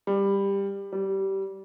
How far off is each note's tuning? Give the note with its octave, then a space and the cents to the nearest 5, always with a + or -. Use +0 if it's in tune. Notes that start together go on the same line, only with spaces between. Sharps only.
G3 +15
G3 -20